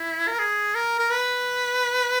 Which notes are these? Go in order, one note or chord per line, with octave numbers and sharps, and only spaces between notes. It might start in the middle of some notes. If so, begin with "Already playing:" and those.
Already playing: E4
A#4
G#4
A#4
A#4
B4